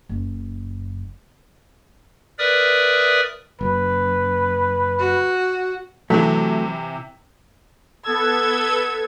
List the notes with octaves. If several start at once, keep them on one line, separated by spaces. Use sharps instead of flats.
F#1 F#2
A#4 B4 D5 E5 D#6
F#1 B4
F#4
C3 E3 F#3 A3
B3 A4 E6 G#6